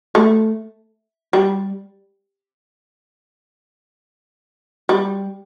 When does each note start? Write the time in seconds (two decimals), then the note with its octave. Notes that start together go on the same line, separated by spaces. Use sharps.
0.15 A3
1.33 G3
4.89 G3